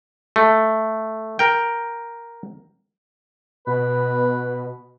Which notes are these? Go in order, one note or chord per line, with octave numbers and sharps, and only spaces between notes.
A3
A#4 G5
B2 B4